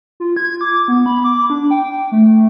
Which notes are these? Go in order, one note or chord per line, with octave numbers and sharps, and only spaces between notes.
F4
G#6
D6
B3
B5
D6
D4
G5
A3